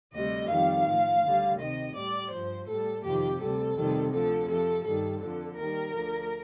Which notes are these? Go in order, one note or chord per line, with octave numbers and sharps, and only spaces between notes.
D2 C3 G3 D#5
F2 D#3 G3 F5
A2 F3
D2 D3 G3
D2 C3 D#3 D#5
A2 G3 D5
G2 F3 C5
A2 G3 A4
F2 C3 D#3 G4
D2 C3 G3 A4
F2 C3 D#3 G3
D2 D3 F3 A4
F2 C3 F3 A4
G2 D#3 G3 A4
F2 D3 F3 A4
D#2 D#3 G3 A#4
D2 D3 F3